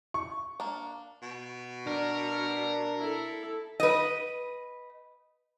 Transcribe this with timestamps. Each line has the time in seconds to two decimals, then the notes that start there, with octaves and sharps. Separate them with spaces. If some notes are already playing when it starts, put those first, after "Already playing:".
0.14 C#6
0.60 A#3 D4
1.22 B2
1.87 D4 A#4
2.99 E4 A4
3.80 B4 D#5